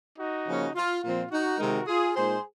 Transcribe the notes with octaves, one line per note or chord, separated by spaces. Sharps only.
D#4 F#4
C#3 F3 A#3 C#4
F4
A#2 F3 C4 F4
D#4 F#4
C3 D#3 G#3 C4 D#4 F#4 A#4
F4 G#4
A#2 G#3 D#4 G#4 C5